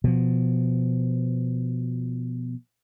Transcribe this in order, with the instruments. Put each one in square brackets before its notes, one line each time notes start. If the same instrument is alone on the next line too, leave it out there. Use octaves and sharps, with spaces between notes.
[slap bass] B2 F3